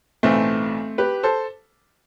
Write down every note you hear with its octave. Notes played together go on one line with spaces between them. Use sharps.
B1 A2 E3 A3 C4
G4 B4
A4 C5